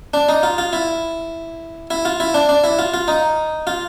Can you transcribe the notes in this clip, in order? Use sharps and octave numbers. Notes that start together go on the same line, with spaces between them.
D4
D#4
F4
F4
E4
E4
F4
E4
D4
D4
E4
F4
F4
D#4
F4